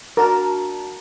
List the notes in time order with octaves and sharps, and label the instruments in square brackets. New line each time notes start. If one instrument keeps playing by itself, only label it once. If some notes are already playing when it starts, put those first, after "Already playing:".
[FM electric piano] D4 F#4 A5 [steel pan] A#4